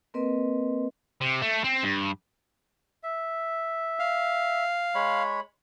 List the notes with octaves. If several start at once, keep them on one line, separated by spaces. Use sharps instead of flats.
A#3 C4 A#4 B4 D#5 C6
C3
A3
C4
G2
E5
F5
G#3 C#5 B5